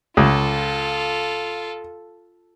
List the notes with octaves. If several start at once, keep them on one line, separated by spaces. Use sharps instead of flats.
C#2 F4 A4